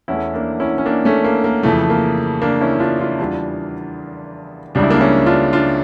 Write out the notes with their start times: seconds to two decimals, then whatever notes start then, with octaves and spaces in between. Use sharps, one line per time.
0.08 E2 E3 A3 C#4 E4
0.34 A#3 D4
0.60 C#4 E4
0.78 C#4
0.85 A#3 D4
1.05 A3 C#4
1.24 A#3
1.44 A#3
1.63 F2 C#3 E3 A3
1.90 A#3
2.42 A#3 D4
2.61 C#4 E4
2.80 D4 F4
2.99 D4 F4
3.19 E2 E3 G3 D4 F4
4.75 C#2 C#3 G3 D4
4.83 E4
4.90 A#3 D4
5.00 C#4 E4
5.26 D4 F4
5.53 D4 F4